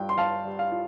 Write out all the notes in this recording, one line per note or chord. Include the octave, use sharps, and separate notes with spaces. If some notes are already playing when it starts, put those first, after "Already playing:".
Already playing: G2 F4 G5
C6
G2 F5 A5
G3
F5
F4